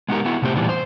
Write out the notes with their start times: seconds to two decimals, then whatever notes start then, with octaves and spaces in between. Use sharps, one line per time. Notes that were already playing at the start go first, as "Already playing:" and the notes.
0.09 G#3 B3 D#4 F#4 G4 A#4
0.25 B3 E4 F#4
0.42 C3 A3 C4 G4 C5
0.56 E2 A#2 E3 G3 B3 D4
0.69 C5